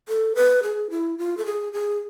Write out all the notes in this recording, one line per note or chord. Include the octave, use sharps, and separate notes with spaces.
A4
B4
G#4
E4
F4
A4
G#4
G#4